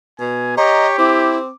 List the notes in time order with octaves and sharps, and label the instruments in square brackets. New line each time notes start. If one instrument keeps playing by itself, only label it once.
[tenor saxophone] B2 [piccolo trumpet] G#5
[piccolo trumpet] G4 [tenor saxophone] C#5 [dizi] D#5 [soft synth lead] A#5
[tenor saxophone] C4 [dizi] E4 [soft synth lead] D6